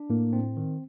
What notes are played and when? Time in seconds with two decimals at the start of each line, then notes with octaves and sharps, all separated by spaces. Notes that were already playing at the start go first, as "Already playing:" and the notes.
Already playing: D4
0.10 A2 A#3
0.33 C4
0.57 D#3